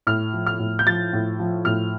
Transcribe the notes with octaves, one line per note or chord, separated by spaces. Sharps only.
A2 F6
F3
F6
A2
G6
F3 A6
A2
F3
A2 F6